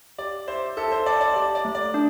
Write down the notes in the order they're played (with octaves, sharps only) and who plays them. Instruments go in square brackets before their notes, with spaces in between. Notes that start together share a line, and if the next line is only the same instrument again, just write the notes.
[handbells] G4 [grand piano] D5
[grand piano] C5 [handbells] E5
[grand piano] A4 [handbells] E5
[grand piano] C5
[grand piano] D5 [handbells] A5
[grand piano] D5
[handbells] G4 [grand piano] D5
[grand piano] D5
[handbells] A3
[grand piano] D5
[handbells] D4